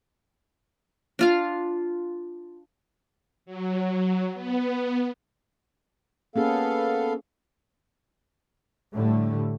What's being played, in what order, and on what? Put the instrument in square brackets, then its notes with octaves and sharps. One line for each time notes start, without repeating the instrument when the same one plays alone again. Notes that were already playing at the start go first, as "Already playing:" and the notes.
[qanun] D4 F4 F5
[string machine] F#3
B3
[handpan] A#3 C#4 G#4 [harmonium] B3 A4 F5
[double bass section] A2 D3 G3 A3